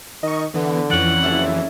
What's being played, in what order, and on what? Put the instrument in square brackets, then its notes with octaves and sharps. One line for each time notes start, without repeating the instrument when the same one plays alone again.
[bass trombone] D#3 [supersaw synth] D#5 C#6
[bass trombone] D3 [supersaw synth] E3 B3
[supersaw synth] F2 E3 [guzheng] C#4 D5 [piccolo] F#5
[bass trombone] F#1 [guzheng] E4 A4